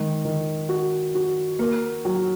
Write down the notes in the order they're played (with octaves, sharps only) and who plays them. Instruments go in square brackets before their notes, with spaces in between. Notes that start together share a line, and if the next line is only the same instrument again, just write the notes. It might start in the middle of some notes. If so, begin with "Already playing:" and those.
Already playing: [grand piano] D#3 [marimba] G#3
[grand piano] D#3
F#4
F#4
[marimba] A#3 [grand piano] A#4
[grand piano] F#3